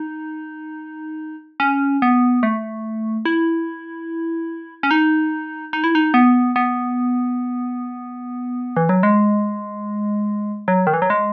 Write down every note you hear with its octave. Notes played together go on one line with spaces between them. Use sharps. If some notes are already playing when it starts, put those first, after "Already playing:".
Already playing: D#4
C#4
B3
A3
E4
C#4
D#4
D#4
E4
D#4
B3
B3
E3
F#3
G#3
F#3
D#3
E3
F#3
G#3